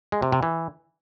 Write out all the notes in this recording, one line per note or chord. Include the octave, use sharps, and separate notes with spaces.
G#3
C3
C3
E3